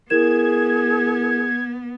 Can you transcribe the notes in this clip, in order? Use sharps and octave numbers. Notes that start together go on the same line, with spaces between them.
B3 E4 G#4 A#4 G#6 E7